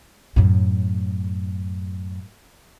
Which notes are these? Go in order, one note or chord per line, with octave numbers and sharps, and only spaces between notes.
F#2 A2